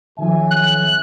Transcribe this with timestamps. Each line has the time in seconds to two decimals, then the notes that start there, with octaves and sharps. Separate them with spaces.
0.19 B1 D#3 F3 E5 G#5
0.51 F#6